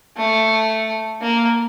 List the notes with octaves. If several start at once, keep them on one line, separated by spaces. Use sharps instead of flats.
A3
A#3